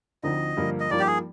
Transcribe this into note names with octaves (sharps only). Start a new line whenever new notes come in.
D2 D3 F3 C4 D#4 D#5
G2 D3 F3 A#3
D#5
G2 F3 A#3 D#4 D5
G4
G#4